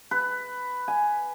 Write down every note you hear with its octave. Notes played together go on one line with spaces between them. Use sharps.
B4
G#5